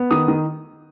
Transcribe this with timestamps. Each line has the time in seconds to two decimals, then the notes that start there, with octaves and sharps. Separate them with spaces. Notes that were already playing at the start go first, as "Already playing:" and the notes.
Already playing: B3
0.11 D#3 D#6
0.28 D#3